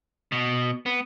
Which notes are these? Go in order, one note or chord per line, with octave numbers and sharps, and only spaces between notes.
B2
B3